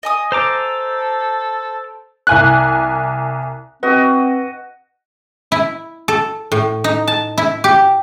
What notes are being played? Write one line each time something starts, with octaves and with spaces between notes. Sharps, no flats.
D#5 G#5 D#6
A4 C5 A#5 D6
C2 G#5 F#6
C4 F#4 B4 D#5
E4
A4
A2
D#4
A5
E4
G4